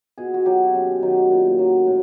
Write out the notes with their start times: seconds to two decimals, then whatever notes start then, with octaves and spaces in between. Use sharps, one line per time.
0.18 B2 G#4
0.34 F#4
0.46 F#3 G4
0.64 G#4
0.74 F#2 G4
1.02 D#3 F#3
1.30 A#2
1.59 F#3
1.87 A2